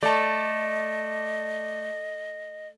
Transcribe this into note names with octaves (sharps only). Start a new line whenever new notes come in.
A3 D5 D#5 A5